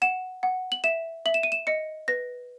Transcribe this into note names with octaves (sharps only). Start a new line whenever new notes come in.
F#5 E7
F#5
F#7
E5 E7
E5 F#7
E7
D#7
E7
D#5 C#7
B4 A#6